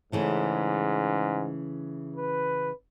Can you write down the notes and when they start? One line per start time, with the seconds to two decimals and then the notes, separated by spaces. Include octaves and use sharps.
0.12 G#2 C#3 E3 A3
2.16 B4